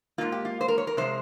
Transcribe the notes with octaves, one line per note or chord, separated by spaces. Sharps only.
G#2 D#3 A#3 F4
G4
F4
C5
A#4
C#5
A#4
C3 F3 G#3 C5